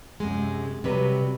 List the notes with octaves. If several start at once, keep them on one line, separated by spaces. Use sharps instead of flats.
F#2 C3 G#3
C3 F#3 G3 B4